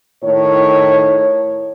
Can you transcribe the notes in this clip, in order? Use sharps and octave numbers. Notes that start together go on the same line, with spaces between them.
A2 D#3 C#5